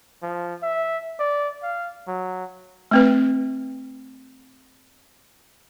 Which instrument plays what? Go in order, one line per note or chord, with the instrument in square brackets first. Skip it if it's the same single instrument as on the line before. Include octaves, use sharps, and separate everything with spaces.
[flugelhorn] F3
E5
D5
F5
F#3
[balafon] A3 C4 B4